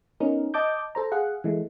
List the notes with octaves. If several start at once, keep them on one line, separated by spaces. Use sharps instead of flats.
B3 C#4 D#4 A#4
D#5 A5 D6 G6
A4 C5 A#5
G#4 F5 F#5
E3 G#3 A3